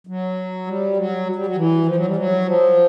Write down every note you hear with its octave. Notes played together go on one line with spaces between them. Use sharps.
F#3
G3
F#3
G3
F#3
E3
F3
F#3
G3
F#3
F3